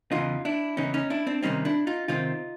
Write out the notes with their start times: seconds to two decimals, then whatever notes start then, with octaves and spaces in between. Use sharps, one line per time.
0.12 E2 C#3 E3 D#4 F4
0.45 D4 E4
0.77 E2 C#3 E3 C#4 D#4
0.94 C#4 D#4
1.10 D4 E4
1.27 C4 D4
1.42 C3 D#3 G3 C4 C#4 D#4
1.65 D4 E4
1.87 D#4 F4
2.08 C3 D#3 G3 C4 D#4 F4